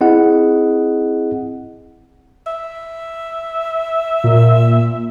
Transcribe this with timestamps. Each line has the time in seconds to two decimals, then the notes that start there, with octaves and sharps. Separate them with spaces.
0.01 C4 E4 G#4 D#5 F#5
2.47 E5
4.24 A#2